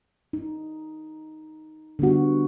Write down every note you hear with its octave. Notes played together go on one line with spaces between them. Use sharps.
D#4
D3 G3 B3 F#4